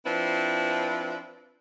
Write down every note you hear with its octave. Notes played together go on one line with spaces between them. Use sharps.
F3 C4 D4 E4 B4